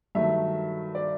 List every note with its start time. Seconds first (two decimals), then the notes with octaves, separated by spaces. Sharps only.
0.15 G2 D#3 F#3 A3 E5
0.95 D5